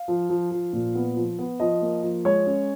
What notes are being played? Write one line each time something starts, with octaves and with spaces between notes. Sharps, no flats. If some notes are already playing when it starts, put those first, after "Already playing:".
Already playing: F5
F3
F3
F3
A#2
B3
F3
B3
F3 D#5
A#3
F3
G#3 C#5
C#4